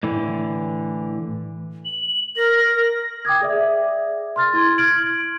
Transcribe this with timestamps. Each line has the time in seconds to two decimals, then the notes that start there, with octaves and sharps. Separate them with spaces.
0.03 A2 D3 E3
1.85 F#7
2.37 A#4 A#6
3.25 G5 D6 D#6 G#6
3.41 G#4 D5 E5
4.36 C6 F6 A6
4.54 E4 C6 G#6
4.78 F6 G#6 D7 F#7